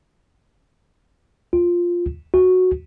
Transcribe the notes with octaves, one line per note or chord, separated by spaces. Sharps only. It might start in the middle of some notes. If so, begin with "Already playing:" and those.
F4
F#4